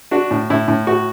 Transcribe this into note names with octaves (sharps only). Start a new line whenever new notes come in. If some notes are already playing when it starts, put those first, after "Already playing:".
D4 F#4
A2
A2 E4
A2
A2 F#4